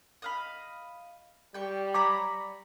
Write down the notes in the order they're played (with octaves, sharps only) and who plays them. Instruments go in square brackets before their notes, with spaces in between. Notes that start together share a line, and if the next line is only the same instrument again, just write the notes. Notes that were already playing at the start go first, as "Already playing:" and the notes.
[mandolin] D#5 F5 B5
[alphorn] G3 [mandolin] G5 C#6
[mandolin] C#5 A#5 B5 [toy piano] D6